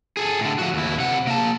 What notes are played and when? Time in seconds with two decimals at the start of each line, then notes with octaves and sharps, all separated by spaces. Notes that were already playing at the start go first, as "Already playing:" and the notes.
0.17 G#4 A4
0.40 A2 D3
0.59 F3 F#4
0.74 D#2 E4
1.00 C3 F#5
1.27 A#3 A5